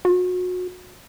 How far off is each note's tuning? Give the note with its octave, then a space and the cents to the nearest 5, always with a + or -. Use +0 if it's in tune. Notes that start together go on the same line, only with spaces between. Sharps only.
F#4 -30